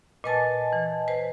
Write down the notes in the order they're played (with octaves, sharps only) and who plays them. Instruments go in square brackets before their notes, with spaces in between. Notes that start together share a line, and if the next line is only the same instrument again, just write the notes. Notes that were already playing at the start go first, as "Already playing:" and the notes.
[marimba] A#2 B4 A6 [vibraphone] D#5 G#5 A5
[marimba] E3
B4 C5 A5